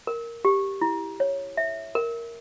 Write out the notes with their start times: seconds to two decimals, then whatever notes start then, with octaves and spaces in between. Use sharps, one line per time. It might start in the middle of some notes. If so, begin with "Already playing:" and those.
0.07 A#4
0.45 G4
0.81 E4
1.20 C#5
1.57 E5
1.95 A#4